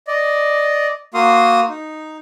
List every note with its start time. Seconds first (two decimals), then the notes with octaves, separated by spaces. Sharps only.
0.07 D5 D#5
1.14 A#3 F#4 F5 C6 D#6
1.69 D#4